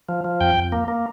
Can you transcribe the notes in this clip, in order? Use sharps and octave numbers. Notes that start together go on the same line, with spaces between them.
F3
F3
F2 G5
F2
A#3
A#3